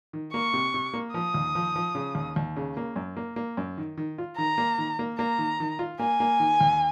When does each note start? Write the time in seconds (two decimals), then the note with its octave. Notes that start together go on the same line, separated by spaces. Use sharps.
0.13 D#3
0.34 A#3 C#6
0.54 C3
0.74 C3
0.94 A#3
1.14 F3 D#6
1.34 D#2
1.55 F3
1.76 F3
1.95 C#3
2.15 D#2
2.36 D#2
2.56 C#3
2.77 A#3
2.96 F#2
3.17 A#3
3.36 A#3
3.57 F#2
3.78 D#3
3.97 D#3
4.18 F4
4.37 D#3 A#5
4.58 A#3
4.78 D#3
4.99 A#3
5.18 A#3 A#5
5.39 D#3
5.60 D#3
5.79 F4
5.99 A#3 G#5
6.20 A#3
6.40 D#3
6.61 D#2